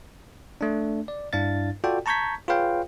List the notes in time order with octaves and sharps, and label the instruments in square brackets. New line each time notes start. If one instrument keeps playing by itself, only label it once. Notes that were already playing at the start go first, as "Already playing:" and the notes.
[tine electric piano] A3 D4
D5
G2 D4 E4 F5 A6
F4 F#4 A4 D5 G5
A5 A#5 C#6 G6 G#6 B6
F4 G#4 B4 C#5 F5 G5